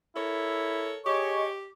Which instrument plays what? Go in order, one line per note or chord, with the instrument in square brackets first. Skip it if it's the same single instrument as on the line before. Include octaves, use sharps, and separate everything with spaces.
[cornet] E4 [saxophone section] A4 A#4 C#5
[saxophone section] G4 [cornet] G#4 [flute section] C#5 D#5 C#6